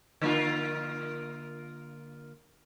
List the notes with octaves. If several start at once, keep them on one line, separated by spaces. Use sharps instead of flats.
D3 A#3 F4